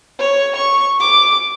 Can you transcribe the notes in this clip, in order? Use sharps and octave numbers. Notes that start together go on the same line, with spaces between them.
C#5
C#6
D6